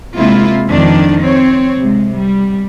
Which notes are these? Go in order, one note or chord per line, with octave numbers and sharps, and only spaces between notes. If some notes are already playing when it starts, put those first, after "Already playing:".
C3 G#3 A#3 E4 F4
F2 D#3 D4
C4 C#5
C3 G#3
G3